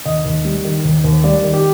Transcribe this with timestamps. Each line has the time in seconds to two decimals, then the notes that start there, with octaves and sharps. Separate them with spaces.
0.05 D#2 D#5
0.25 D#2
0.45 G3
0.65 D#3
0.85 D#2
1.04 D#2
1.24 G3 D5
1.44 D#3
1.54 G4